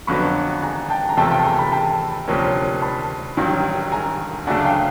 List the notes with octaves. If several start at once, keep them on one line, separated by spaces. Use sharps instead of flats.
F2 D3 F#3 B3 B5 C#6
G#5 A#5
G5 A5
A#5
E2 C3 F3 A3 G5 A5
G5 A5
G#5 A#5
A5 B5
G5 A5
D2 C3 F3 A#3 C#4
A5 B5
A1 G2 D#3 F#3
G#5 A#5
D2 C#3 F#3 A3 D4 F#5 G#5
F5 G5